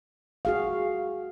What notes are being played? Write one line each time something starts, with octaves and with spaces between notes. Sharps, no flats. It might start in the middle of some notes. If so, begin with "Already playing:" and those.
F#4 G#4 F5